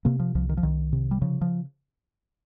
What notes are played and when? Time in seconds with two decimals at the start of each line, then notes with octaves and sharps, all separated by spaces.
0.05 C3 A#3
0.20 F3
0.35 C2 F3
0.49 D#3
0.57 F3
0.63 C2 D#3
0.93 C3
1.11 G3
1.22 C#3 F3
1.42 F3